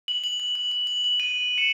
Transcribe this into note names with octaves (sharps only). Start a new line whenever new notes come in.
F#7
F#7
F#7
F#7
F#7
F#7
F#7
D#7 F#7
C#7 E7